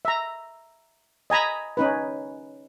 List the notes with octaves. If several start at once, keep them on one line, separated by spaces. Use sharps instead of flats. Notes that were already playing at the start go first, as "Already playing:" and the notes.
E5 A#5
D#5 G#5 A#5 B5
C#4 D#4 B4